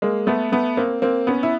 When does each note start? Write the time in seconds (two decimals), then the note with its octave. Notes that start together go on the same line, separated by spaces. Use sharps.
0.02 G#3 A#3
0.27 A3 B3
0.52 A3 B3
0.77 A#3 C4
1.02 A#3 C4
1.27 B3 C#4
1.43 E4